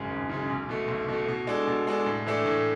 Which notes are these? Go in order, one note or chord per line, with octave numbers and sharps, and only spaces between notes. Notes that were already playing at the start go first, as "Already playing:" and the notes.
Already playing: G#1 F#2 C#3 G#3
G#1
F#2 C#3 G#3
B1
B2 A3
B1
B2 A3
B2
G#3 D4 A4
B2
G#3 D4 A4
A2
E3 A3 D4 A4
A2